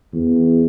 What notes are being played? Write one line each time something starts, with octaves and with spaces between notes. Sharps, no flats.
E2